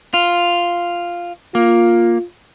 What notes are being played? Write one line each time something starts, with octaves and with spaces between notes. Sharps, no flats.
F4
A#3 F4